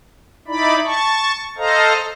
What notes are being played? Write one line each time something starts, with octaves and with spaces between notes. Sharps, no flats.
D#4 E4 D5 B5
A5 C#6
A4 C5 D#5 F5 A#5